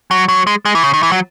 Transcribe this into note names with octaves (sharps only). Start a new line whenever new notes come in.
F#3
F#3
G#3
G#3
E3
C#3
D#3
E3
F#3